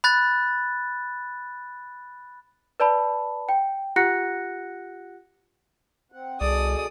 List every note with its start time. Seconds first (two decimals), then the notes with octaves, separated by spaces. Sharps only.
0.04 B5 F#6 A6
2.80 B4 D5 A5 B5
3.49 G5
3.96 F4 G4 F#5 F#6 A#6 C#7
6.12 C4 F#5
6.41 C2 B2 G#4 A4 D5 D#6